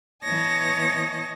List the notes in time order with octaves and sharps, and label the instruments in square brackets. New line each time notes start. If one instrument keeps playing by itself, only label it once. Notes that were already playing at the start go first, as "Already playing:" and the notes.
[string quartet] E3 B3 C#5 D#5 A5 A#6